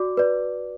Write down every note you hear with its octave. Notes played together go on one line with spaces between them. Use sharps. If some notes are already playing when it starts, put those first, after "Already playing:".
Already playing: F#4 D5 D6
B4 D5